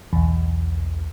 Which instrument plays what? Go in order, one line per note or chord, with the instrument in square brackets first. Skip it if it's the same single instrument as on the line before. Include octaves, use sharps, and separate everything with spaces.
[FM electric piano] B1 E2